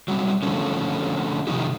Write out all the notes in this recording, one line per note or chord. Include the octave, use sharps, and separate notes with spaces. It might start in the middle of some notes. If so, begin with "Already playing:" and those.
F#3 G3 A#3 C4
D3 F3 A3 C4 C#4
C3 D#3 F3 D#4 G4